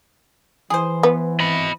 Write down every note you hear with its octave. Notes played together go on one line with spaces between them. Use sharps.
E3 G#4 C5
B3
D#5 B5